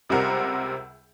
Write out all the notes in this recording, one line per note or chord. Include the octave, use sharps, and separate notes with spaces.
C#2 C3 G3 C4 A#4 F#5